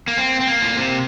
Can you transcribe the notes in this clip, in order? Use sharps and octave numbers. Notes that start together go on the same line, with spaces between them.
A#3
C4
C4
A#3
A2
A#2
C3